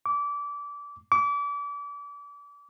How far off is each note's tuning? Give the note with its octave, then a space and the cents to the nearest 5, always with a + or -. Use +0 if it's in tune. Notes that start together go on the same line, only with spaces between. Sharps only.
D6 -25
D6 -35